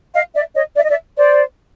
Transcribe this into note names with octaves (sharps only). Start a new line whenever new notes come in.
D#5 F5
D5 E5
C#5 D#5
D5 E5
D#5
D5 E5
C5 D5